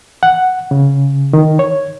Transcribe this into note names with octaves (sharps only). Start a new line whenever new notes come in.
F#5
C#3
D#3
C#5